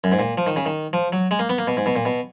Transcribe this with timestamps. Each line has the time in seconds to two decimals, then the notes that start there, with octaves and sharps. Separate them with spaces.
0.04 F#2
0.12 G#2
0.19 A#2
0.38 F3
0.47 D#3
0.56 C#3
0.66 D#3
0.93 F3
1.12 F#3
1.31 G#3
1.39 A#3
1.49 B3
1.58 A#3
1.67 B2
1.77 G#2
1.86 B2
1.96 A#2
2.05 B2